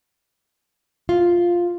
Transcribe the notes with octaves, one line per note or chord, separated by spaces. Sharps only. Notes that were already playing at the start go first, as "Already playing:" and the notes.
F4